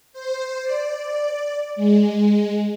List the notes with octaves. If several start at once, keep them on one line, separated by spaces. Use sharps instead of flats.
C5
D5
G#3